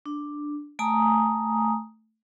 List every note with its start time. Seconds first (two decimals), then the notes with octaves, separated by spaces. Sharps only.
0.06 D4
0.79 A3 G#5 A#5 D#6